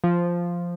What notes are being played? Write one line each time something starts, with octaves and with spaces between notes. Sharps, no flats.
F3